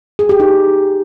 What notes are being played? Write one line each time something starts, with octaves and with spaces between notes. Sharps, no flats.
G#4
G4
D#4